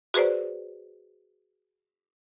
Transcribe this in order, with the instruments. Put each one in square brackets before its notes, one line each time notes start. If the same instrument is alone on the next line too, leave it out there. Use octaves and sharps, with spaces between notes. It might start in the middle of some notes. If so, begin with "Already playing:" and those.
[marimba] F#4 G#4 B4 C5 D5